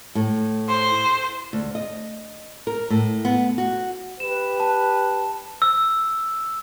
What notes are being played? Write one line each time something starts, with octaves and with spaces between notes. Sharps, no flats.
A2
C5
D2
D#5
A#4
A2
B3
F#4
G4 B4 E7
A5
E6